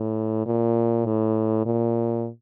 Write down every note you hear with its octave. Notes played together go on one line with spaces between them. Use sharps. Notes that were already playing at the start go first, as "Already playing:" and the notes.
Already playing: A2
A#2
A2
A#2